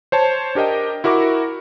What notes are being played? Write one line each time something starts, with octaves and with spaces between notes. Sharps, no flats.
C5 C#5 A5
D4 G4 A#4 D#5 G5
E4 F#4 A#4 C#6 D6